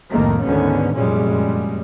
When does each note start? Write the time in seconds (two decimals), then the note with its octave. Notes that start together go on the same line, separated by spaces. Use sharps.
0.10 C2 F2 A2 D#3 A3 A#3
0.43 D2 G#2 D3 D#3 B3 C#4
0.94 F1 F#2 A#2 G3 G#3 C#4